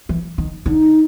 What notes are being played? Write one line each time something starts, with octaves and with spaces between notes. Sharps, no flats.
E3
D#3
D3 D#4